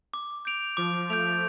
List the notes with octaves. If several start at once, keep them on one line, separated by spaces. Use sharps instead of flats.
D6
G6 D7 F7
F3 D6
A3 G6 D7 F7